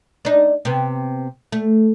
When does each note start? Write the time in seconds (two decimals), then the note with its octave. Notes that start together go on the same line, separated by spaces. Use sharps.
0.25 D4 D#4
0.65 C3 B3
1.52 A3